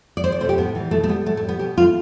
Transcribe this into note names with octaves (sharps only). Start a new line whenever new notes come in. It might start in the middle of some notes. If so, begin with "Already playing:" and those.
D5
E2 C5
D5
B2 A3 C5
G4
A2 B3
E3 G3
B2 A3
A3
G3 B3
A2 A3
A3
G3
B3
B2 G4
A3 F4